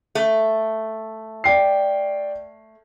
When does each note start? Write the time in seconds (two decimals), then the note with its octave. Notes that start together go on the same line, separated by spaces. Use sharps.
0.15 A3
1.44 D5 G5 C7